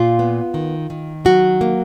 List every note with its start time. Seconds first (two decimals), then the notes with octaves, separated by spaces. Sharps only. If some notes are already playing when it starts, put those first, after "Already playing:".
Already playing: A#2 F4
0.19 B3
0.54 D#3
0.90 D#3
1.25 F#3 F#4
1.61 A#3